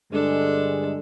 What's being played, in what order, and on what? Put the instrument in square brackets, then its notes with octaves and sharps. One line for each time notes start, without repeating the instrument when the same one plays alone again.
[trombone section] G2 D3 G#3 [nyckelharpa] D4 A4